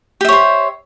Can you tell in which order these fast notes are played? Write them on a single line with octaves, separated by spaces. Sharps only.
G4 E5 C#5 C5